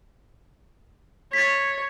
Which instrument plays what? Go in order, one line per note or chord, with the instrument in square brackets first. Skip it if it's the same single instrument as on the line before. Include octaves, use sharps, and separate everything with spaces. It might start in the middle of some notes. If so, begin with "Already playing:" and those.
[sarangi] C#5 [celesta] A6 B6